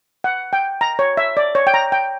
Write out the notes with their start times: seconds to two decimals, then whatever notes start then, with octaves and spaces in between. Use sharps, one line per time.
0.24 F#5
0.53 G5
0.81 A#5
0.99 C#5
1.17 E5
1.37 D5
1.55 C#5
1.67 G5
1.74 A#5
1.92 G5